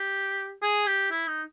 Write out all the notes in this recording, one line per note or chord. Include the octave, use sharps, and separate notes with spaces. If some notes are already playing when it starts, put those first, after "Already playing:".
Already playing: G4
G#4
G4
E4
D#4